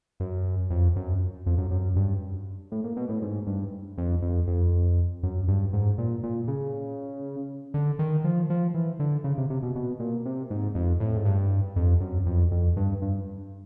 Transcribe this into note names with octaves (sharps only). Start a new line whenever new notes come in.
F#2
F2
F#2
F2
F#2
F#2
G2
A2
A#2
B2
A2
G#2
G2
F2
F2
F2
F#2
G2
G#2
A#2
A#2
C#3
D3
D#3
F3
F3
E3
D3
C#3
C3
C3
B2
B2
A#2
C3
G#2
F2
A2
G#2
G2
F2
F#2
F2
F2
G2
G2